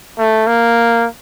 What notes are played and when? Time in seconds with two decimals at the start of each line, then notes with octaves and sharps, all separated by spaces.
0.18 A3
0.47 A#3